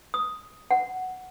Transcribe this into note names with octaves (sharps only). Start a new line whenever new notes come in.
D#6
F#5